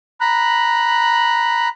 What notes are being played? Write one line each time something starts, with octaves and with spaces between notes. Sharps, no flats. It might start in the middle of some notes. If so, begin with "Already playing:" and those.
A#5 B5 F#6